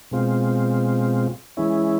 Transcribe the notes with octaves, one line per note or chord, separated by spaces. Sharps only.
B2 G#3 C4 F4
E3 G#3 C#4 E4